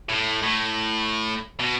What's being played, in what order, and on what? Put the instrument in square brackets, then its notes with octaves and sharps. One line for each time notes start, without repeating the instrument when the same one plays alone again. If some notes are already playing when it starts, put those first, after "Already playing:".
[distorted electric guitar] A2
A2
B2